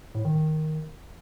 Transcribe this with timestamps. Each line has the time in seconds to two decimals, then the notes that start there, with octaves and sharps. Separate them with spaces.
0.15 A2
0.25 D#3
0.35 D#3